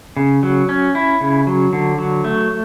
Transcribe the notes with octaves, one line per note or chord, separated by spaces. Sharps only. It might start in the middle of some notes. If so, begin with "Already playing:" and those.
C#3
F#3
C#4
E4
C#3
F#3
D3
F#3
A3